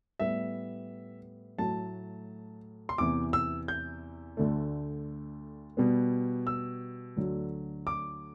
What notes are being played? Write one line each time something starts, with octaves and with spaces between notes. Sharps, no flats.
A2 G3 B3 E5
A2 F#3 A3 A5
C6
E2 C3 E3 D6
E6
G6
D2 D3 A3
B2 G3 B3
E6
D2 D3 F#3
D6